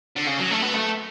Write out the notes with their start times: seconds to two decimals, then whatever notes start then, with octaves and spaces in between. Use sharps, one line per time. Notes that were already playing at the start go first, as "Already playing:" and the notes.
0.16 D3
0.27 C#3
0.39 F#3
0.51 A3
0.62 B3
0.74 A3